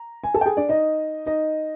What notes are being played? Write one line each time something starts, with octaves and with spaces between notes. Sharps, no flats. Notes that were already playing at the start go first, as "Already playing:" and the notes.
Already playing: A#5
G#5
A4 A5
G5
G#4 G#5
D4 D5
D#4 D#5
D#4 D#5